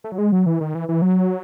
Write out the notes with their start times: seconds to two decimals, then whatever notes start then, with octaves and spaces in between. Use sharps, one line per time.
0.04 A3
0.12 F#3
0.18 G#3
0.32 F#3
0.46 E3
0.60 D#3
0.75 E3
0.88 E3
1.02 F#3